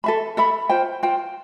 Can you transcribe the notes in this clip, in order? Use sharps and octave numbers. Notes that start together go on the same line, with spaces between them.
A4 E5 B5
A4 E5 B5
F4 C5 G5
F4 C5 G5